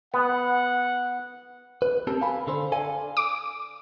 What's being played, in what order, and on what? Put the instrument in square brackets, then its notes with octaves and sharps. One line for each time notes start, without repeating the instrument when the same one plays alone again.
[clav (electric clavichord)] B3 [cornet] F#5
[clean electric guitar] B4
C4 G4 A4 A#4
F5 G#5 B5
D3 A4 C5
A4 D5 F5 G#5
[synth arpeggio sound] D6